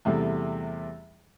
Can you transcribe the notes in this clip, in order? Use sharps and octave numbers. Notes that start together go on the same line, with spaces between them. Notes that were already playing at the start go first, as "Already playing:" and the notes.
E2 C3 G3 A3